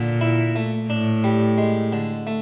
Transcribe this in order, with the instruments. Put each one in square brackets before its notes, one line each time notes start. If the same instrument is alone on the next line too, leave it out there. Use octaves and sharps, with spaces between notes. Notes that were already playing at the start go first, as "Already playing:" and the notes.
Already playing: [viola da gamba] A#2 [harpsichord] D3
[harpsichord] E4
A3
[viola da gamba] A2 [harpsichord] D4
[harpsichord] G3
G#3
D3
A3